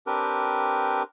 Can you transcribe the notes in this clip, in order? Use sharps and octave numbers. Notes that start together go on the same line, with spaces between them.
C4 D4 G4 A#4 B4